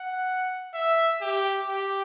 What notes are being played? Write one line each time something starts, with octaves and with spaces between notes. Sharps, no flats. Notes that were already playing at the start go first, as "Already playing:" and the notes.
Already playing: F#5
E5
G4
G4